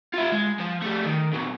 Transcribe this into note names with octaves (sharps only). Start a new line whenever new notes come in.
F4 E5
G#3
F3
G3 A3
D#3
A#2 F#3